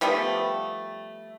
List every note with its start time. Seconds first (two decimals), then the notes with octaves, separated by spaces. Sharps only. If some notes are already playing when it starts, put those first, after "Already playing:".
0.01 F3 G3 A3 B3